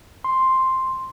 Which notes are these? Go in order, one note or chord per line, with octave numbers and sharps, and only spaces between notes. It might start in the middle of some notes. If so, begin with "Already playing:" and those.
C6